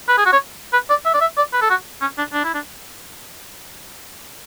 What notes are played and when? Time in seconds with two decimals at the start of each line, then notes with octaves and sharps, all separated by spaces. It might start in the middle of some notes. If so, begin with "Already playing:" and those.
0.08 B4
0.17 G#4
0.25 F#4
0.32 C#5
0.73 B4
0.89 D5
1.05 E5
1.14 D5
1.21 E5
1.37 D5
1.53 B4
1.61 A4
1.70 F#4
2.01 C#4
2.18 D4
2.33 D4
2.44 E4
2.54 D4